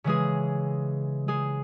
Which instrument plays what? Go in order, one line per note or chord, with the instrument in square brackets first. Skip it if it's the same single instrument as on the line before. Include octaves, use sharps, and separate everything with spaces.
[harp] C#3 E3 G#3 G#4
G#3 G#4